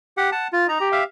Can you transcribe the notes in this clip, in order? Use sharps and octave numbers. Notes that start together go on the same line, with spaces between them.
G4 F#5
F#5 A5
F4
D#4 A#5
G4
E5 F5